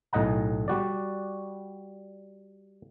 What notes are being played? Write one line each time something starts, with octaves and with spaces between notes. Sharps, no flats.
B1 A2 D#5 F#5 A#5
G3 F#4 D5